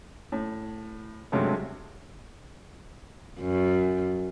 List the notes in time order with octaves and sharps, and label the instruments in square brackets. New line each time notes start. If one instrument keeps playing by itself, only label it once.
[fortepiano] A2
G2 C3 F#3 G#3 A3
[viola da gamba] F#2